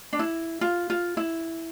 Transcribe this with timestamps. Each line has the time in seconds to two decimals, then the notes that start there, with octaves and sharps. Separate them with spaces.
0.13 D4
0.19 E4
0.61 F4
0.90 F4
1.17 E4